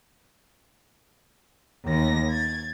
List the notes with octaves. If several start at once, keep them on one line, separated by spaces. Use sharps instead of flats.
D#2 A#6
G#6 A6